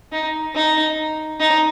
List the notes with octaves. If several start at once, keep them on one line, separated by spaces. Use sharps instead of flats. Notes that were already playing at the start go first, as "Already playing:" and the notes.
D#4
D#4
D#4